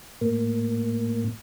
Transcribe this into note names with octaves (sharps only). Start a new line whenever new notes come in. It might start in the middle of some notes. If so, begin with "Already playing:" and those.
A2 A#3